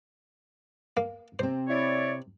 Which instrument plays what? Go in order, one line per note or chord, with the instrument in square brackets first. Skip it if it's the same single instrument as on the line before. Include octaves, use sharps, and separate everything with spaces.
[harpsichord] A#3
[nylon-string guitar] C3 C4 [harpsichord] C5
[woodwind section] E4 C#5 D5